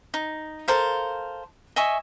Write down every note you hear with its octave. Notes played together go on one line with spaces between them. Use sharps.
D#4
A4 A#4 C5 F5
D#5 E5 G#5 C#6